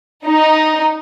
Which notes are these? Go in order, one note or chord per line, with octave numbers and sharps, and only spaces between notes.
D#4